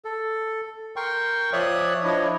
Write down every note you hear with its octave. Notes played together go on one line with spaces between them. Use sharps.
A4
A#4 G5 C6 C#6
F3 C#5 D5 E5 D#6 F#6
F3 D4 E4 C#5 D#5